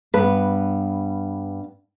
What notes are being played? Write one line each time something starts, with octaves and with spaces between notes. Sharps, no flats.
G2 B3 B4